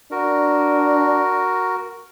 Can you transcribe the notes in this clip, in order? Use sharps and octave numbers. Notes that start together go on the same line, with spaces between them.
D4 F#4 A#4